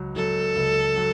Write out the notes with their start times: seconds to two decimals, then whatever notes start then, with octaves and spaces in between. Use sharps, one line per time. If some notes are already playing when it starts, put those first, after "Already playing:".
Already playing: C#2 F#3
0.16 F#3 A4
0.56 C#2
0.96 F#3